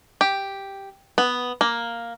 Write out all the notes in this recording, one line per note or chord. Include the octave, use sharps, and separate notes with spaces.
G4
B3
A#3